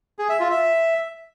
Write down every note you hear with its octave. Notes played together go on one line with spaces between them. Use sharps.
G#4
E5
F4
E5